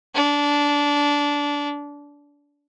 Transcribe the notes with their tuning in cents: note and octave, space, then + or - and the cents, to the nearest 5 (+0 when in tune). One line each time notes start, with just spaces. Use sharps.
D4 -20